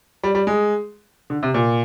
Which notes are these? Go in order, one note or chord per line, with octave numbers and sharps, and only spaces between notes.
G3
G3
G#3
D3
C3
A#2